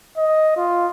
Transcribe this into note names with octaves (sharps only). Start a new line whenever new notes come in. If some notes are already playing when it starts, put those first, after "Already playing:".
D#5
F4